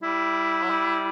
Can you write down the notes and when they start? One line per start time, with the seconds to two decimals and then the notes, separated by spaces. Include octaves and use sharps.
0.03 G3 E4
0.63 F#3
0.70 G3